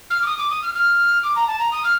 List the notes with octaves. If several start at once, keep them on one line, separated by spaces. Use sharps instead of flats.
F6
D6
D#6
D6
D#6
F6
F6
D6
A#5
A5
A#5
D#6
F6